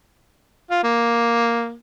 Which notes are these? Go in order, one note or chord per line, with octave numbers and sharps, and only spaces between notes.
F4
A#3